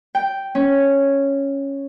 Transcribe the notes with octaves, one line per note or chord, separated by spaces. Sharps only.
G5
C#4